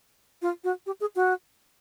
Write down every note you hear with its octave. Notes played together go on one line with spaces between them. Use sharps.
F4
F#4
G4
G#4
F#4